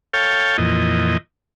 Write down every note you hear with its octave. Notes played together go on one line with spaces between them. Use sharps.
A4 C#5 F5 G5
F2 A#2 E3 D#5